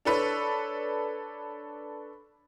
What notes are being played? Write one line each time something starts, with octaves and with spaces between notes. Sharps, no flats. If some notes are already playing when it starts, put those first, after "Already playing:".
D4 A4 B4 C#5